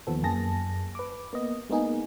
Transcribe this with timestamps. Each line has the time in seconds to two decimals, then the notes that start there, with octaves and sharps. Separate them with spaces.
0.07 D#2 F3 B3 A4
0.23 F#2 A#3 G#4 A5 A#6
0.95 B4 D6
1.33 A#3 B3 D#5
1.70 G#3 A#3 B3 D#4 G#4